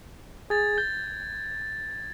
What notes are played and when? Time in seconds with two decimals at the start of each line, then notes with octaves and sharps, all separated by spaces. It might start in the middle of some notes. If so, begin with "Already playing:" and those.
0.50 G#4 G#6 A6
0.78 G6